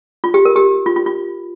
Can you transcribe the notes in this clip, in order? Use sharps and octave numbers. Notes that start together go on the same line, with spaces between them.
F4
G4
A#4
G4
F4
F4
F4